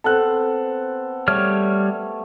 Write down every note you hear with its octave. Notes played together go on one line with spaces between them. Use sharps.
B3 C4 A4 F#6
G3 A3 C#5 F6